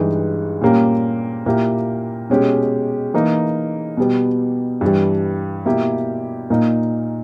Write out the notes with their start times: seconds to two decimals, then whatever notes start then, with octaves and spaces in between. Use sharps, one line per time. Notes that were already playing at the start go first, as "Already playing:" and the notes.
Already playing: G2 E3 G#3 D#4
0.61 A#2 G3 A#3 C#4 G4
1.46 A#2 A#3 E4 G4
2.30 B2 G#3 C#4 G4
3.14 E3 A#3 D#4
3.97 B2 G3 B3
4.81 G2 E3 G3
5.65 B2 A#3 E4 G4
6.50 A#2 A#3 D#4